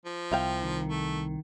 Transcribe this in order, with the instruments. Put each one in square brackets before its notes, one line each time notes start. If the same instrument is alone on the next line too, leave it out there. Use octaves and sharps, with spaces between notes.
[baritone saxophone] F3
[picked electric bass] C2 [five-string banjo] E5 F5 G5
[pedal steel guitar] D#3
[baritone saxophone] A3